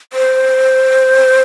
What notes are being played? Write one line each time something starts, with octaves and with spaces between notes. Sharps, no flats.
C5